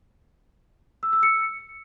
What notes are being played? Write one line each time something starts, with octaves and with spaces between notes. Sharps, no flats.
E6
E6
C#7